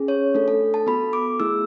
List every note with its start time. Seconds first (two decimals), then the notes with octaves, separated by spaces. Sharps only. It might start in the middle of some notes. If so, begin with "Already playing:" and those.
Already playing: C#4 G#4
0.08 C#5
0.34 A3 D4 A4
0.48 A4
0.74 A5
0.87 B3 F#4 A4 B5
1.13 D6
1.40 A3 E4 G#4 E6